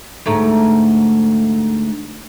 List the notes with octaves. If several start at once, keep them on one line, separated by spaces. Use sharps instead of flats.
D2 G#2 A3